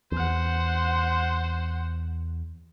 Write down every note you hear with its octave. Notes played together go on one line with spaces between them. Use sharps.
E2 C5 F#5